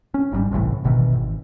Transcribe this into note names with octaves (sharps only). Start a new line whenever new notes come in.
C#4
G#1 G#2 C#3 G3
G1 C2 A2 E3
G1 B2 D#3 E3
G#1